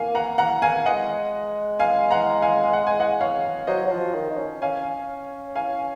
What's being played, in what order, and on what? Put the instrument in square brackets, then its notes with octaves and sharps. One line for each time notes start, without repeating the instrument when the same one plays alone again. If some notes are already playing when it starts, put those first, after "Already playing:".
Already playing: [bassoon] A#3 [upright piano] F5 G#5
[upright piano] F#5 A#5
F#5 A#5
F5 G#5
[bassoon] G#3 [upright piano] D#5 F#5
[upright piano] F5 G#5
F#5 A#5
F5 G#5
F#5
G#5
D#5 F#5
C#5 F5
[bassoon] F#3 [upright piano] C5 D#5
[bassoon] F#3
F3
D#3
D#4
C#4
[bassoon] C#4 [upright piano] F5 G#5
[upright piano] F5 G#5